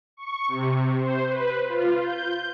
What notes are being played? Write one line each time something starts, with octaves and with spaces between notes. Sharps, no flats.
C#6
C3
C5
B4
F4
G6